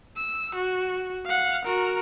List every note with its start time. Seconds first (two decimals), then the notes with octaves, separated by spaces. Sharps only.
0.17 E6
0.55 F#4
1.25 F5 F#5
1.65 F#4 A#4